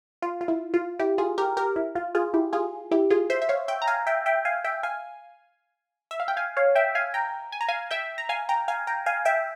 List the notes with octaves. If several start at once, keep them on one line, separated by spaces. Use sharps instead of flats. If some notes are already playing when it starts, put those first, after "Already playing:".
F4
F4
E4
F4
E4 G4
F4 G#4
G4 A#4
G4 A#4
E4
F4
F4 G#4
E4 G4
F4 G#4
E4 G4
F4 G#4
C5 E5
E5
C#5 F5
E5 G5
A#5
F5 G#5
E5 G5
E5 G5
F5 G#5
E5 G5
F5 G#5
E5
F5
G5
F5 G#5
C#5 F5
E5 G5
F5 G#5
G5 A#5
G#5
A#5
F5 G#5
E5 G5
A#5
F5 G#5
G5 A#5
F5 G#5
G5 A#5
F5 G#5
E5 G5